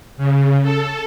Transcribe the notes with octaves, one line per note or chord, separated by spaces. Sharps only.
C#3
A4